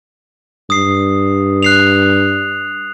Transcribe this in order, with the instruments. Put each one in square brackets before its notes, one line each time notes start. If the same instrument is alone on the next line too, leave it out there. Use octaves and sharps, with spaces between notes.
[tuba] G2 [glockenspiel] D#6 C7
[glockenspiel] F#6 C7 F7